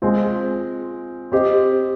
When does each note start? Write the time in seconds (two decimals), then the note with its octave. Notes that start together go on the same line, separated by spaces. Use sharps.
0.02 G#3 C4 F4
1.32 C4 G4 C5 D#5